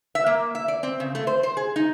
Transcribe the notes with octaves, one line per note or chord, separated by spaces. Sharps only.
E5
A#3
E5
D5
C4
C#3
A3
C5
C5
G#4
D#4